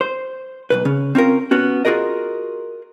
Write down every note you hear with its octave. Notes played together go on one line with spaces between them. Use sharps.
C5
B1 G#2 B4
C#3 C#4
C4 C#4 F4 A#4
B3 C#4 F#4
F4 F#4 G#4 A#4 D#5